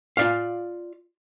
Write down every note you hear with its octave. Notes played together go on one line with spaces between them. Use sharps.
F4 D5 F5